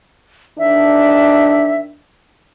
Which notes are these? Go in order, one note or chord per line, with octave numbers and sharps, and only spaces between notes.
E2 D#3 D4 E5